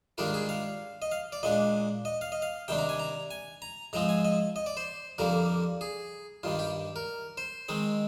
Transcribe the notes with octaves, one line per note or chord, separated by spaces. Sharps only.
G#2 D#3 G3 D4 F4 A#4
G#4
F5
D#5
F5
D5
A#2 G#3 D4 D#5
D#5
F5
D#5
F5
C3 D#3 G3 D4 G5
A#5
G#5
A#5
G#5
A#5
G#2 F3 G#3 C4 A#5
G#5
D#5
D#5
D5
C5
F2 D3 G3 A#3 A#4
G#4
G2 D#3 G3 F4
G4
A#4
C5
D#3 G#3 C4